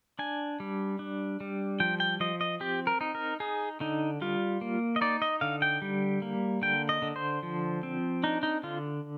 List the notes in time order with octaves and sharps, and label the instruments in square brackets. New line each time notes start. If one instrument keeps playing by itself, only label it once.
[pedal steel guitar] D4 G#5
G3
D4
G3
F3 G5
G5
F3 D#5
D#5
C4 G4
A#4
D#4
A#4
D#4 G#4
D3 D#4
G3 F4
A#3
D#5
D#4 D5
D#5
D3 F5
G5
G3
A#3
D3 G5
D#5
D3
C5
F3
C4
D4 D#4
D#4
D3 F4